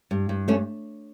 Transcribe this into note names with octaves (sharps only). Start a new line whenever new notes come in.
G2
G2
A3 C#4